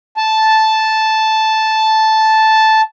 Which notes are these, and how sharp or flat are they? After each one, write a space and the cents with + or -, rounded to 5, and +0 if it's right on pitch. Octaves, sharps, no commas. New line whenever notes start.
A5 -5